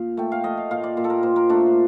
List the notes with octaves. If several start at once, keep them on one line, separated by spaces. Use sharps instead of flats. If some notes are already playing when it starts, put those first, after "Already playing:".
Already playing: A#2 F5
A3 G5
F5
A3 D#5
F5
A#2 F5
D5
A#2
A4
A#4
A#2 C5
A#4
A3 D4